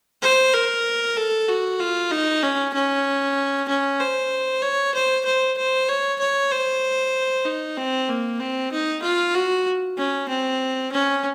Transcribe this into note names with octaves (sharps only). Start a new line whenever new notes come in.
C5
A#4
A4
F#4
F4
D#4
C#4
C#4
C#4
C5
C#5
C5
C5
C5
C#5
C#5
C5
D#4
C4
A#3
C4
D#4
F4
F#4
C#4
C4
C#4